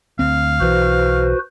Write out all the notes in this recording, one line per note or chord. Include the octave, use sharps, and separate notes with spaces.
D2 C4 F5
B1 E3 F#4 B4 C5